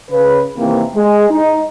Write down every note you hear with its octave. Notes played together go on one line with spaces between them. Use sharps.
C#3 B4
C3 D#3 E3 A#3 C4
G#3
D#4